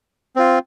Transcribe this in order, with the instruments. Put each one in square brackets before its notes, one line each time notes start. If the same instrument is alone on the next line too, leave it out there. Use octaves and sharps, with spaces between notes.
[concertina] C4 F4